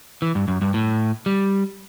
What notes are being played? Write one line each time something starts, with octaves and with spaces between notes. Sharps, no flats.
E3
G2
F#2
G2
A2
G3